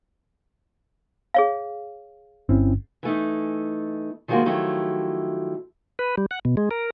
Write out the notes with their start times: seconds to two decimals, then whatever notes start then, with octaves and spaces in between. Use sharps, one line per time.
1.34 G#4 C#5 F5
2.49 G1 C4 C#4 E4
3.03 E3 A3 D#4
4.28 D#3 F3 G3 G#3 A#3 F#4
4.45 D#3 F3 F#3 A3 E4 G4
5.99 B4
6.18 G3
6.31 F#5
6.45 B2
6.57 G#3
6.71 A#4